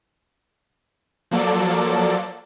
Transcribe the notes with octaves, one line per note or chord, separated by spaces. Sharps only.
F3 F#3 A#3 A4 D5